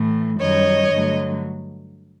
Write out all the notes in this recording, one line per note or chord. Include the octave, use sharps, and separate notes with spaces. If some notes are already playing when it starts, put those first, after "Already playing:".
Already playing: A2 E3 A3
F#2 D#3 G3 C#5 D#5
G2 D3 F#3 A3